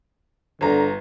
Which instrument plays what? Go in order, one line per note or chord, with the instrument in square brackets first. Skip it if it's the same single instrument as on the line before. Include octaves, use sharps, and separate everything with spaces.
[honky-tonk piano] G1 A#5 [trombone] D3